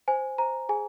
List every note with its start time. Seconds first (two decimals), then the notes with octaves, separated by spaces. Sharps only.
0.08 C5 G#5
0.38 C5 A#5
0.69 G#4 G#5